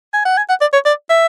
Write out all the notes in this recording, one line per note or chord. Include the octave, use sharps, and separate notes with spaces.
G#5
F#5
G#5
F#5
D5
C#5
D5
E5